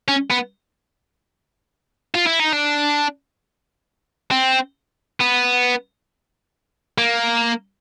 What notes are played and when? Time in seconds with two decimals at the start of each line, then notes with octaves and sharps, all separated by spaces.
0.08 C#4
0.30 B3
2.15 F4
2.27 E4
2.40 D#4
2.53 D4
4.31 C4
5.20 B3
6.98 A#3